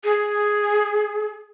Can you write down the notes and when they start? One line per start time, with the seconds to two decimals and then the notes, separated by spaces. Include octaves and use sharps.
0.04 G#4